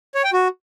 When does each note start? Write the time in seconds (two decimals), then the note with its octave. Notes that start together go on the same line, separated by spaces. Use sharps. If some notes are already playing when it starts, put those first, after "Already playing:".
0.15 C#5
0.24 G5
0.33 F#4